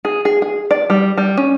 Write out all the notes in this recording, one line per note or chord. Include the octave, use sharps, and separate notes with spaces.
G#4
G#4
G#4
D5
G3
G3
C#4